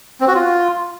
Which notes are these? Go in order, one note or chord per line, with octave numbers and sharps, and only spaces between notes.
C4
F#4
F4